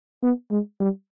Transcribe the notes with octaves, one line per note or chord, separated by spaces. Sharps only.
B3
G#3
G3